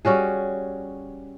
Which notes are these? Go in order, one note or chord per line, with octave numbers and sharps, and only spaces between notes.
G3 C#4 F#4 G#4